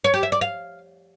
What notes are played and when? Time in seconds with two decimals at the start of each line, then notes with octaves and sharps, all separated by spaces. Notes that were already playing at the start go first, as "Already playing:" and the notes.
0.04 C#5
0.14 G4
0.23 E5
0.32 D5
0.41 F5